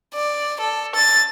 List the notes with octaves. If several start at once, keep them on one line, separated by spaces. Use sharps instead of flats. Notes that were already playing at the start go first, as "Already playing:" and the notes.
D5
A4
A6